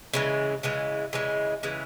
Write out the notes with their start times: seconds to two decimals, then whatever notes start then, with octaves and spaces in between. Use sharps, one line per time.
0.14 C#3 E3 G#3
0.63 C#3 E3 G#3
1.13 C#3 E3 G#3
1.63 C#3 E3 G#3